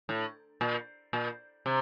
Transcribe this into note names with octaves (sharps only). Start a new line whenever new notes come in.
A2
A#2
A#2
C3